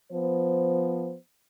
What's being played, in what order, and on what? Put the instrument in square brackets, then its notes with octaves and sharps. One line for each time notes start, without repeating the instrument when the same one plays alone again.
[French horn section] F3 B3 C5